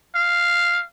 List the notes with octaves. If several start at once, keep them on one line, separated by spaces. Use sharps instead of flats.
F5